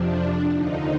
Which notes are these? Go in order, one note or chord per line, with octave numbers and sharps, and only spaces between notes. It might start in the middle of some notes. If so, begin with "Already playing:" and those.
Already playing: F2 C3 F3 D4
D#2 D3 F3 D#4